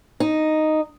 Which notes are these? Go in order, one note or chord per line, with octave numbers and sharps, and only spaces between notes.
D#4